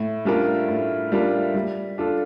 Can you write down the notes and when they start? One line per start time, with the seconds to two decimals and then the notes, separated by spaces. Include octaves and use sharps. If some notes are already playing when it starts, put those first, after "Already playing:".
Already playing: A2
0.25 G3 D4 F4 A#4
0.68 A2
1.12 G3 D4 F4 A#4
1.55 G3
1.98 D4 F4 A4